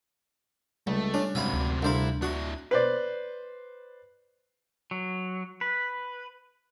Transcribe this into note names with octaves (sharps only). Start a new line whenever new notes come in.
C#2 G3 A3
C#4 D4
G#1 F#2 C3 E5 F5 B5
D2
C2 D3 D4 E4 C5 F5 A#5
D4 E4 F#4 C#6 D#6
B4 C5 D5
F#3
B4